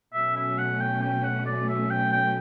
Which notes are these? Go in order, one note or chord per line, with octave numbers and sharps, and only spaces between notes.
B2 F#3 A3 C#4 E5
E5
F#5
G5
G5
F#5
D5
E5
G5
G5